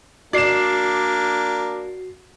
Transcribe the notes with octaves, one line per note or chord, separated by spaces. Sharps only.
A#3 D4 F#4 D5 C7 E7